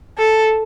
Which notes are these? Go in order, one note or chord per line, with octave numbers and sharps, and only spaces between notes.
A4